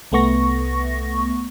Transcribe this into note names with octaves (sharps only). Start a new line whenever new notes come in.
C2 A3 B3 C#6 A#6